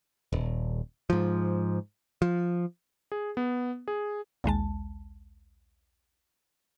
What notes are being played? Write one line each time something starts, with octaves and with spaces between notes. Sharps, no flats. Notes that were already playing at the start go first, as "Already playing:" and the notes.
D#1
G#2 F3
F3
G#4
B3
G#4
A#1 D#2 G#3 A5